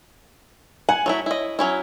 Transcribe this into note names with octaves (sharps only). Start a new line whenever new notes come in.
F#5 G#5
F#3 A3 E4 C#5
E4 D#5
F#3 C#4 E4